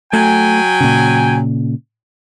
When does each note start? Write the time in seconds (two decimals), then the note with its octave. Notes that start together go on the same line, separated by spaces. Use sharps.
0.13 F#3 A3 G5 G#5
0.81 A#2 C#3